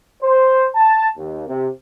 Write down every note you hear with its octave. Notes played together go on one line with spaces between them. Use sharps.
C5
A5
D#2
C3